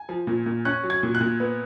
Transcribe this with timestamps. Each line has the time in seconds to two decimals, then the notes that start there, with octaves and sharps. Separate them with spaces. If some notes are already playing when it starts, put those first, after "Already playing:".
Already playing: G#5
0.09 F3
0.27 A#2
0.46 A#2
0.65 C#4 F#6
0.83 F#3
0.90 G#6
1.03 A#2
1.15 F#6
1.21 A#2
1.40 B3